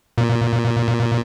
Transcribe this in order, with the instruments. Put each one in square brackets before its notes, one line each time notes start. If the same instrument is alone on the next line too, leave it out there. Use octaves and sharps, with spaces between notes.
[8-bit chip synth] A#2